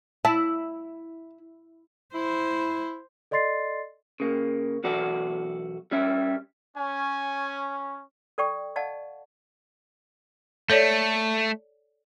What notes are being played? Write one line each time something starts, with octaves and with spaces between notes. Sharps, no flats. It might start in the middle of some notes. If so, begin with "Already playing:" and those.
E4 A5
E4 C5
A4 D5 D#5 C6 A6 C7
C#3 A#3
B1 E2 F#4 A4 D5
G3 C#4 E5
C#4 G#5
A4 D5 G5 C#6
D5 D#5 F5 F#5 A5
A3 A4 C#5 D5